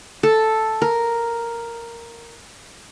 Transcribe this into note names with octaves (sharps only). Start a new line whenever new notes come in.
A4
A#4